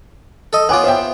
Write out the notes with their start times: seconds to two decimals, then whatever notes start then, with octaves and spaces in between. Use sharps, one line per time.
0.53 A4 D#5
0.69 B3 F4 C#5 G#5 D6
0.84 C5 E5 G5